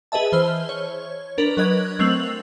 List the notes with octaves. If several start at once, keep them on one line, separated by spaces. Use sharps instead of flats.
G#4 B4 D#5 E5 A5
E3 C5 F6 G7
C#5
D4 A#4 B4
F#3 A#4 B4 D#5 F#6 G#6
F#3 A3 C4 E6 F7 F#7